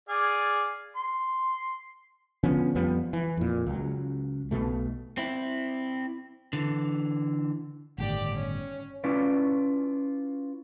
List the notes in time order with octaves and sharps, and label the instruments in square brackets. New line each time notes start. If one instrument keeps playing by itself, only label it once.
[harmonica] G#4 D5 F5
C6
[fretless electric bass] D3 F3 B3 C#4
F2 F3 G3 B3
E3
F2 A#2
C#2 F#3
B1 F2 B2 A3
[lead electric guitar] C4 E4
D3 E3
[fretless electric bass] G1 A2 D#3 [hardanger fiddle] G4 D5
[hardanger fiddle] C#4
[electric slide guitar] C#4 E4 F4 B4 D5